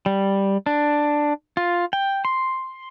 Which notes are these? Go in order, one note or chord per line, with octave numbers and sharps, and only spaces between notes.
G3
D4
F4
G5
C6